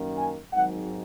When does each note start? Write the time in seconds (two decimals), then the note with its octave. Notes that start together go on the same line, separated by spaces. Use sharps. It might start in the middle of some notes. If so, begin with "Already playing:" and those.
Already playing: F#2 D#3 A#3
0.18 G#5
0.53 G#1 G#2 D#3 F#3 F#5